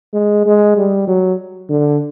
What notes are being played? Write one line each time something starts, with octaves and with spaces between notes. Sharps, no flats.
G#3
G#3
G3
F#3
D3